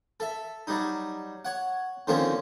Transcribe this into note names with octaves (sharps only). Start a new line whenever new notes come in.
A4 E5
F#3 G3 D#4
C#5 F#5
D3 D#3 F3 A#3 C4 C#4